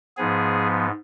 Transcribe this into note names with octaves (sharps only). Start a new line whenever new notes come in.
G#2 F3 B3 G#4